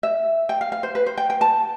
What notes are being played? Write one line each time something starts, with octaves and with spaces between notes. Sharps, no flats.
E5
G5
F5
F5
C5
B4
C5
G5
G5
A5